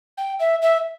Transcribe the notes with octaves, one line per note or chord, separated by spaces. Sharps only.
G5
E5
E5